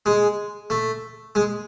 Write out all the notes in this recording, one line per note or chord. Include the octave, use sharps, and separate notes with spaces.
G#3
A3
G#3